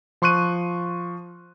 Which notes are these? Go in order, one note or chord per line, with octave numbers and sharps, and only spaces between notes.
F3 C6 C#6 F#6 D#7